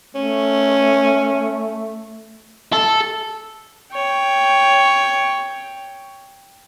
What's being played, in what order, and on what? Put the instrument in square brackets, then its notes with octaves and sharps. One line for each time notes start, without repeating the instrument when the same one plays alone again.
[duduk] A3 [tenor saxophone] C#4
[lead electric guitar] A4
[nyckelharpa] C#5 G5